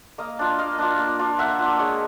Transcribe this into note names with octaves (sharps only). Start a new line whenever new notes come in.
A#3 D#5 F5
D4 F4
A#3 D#5 F5
D4 F4
A#3
D4 F4
A#3 E5 F#5
D4 F4
G#3 C#5 D#5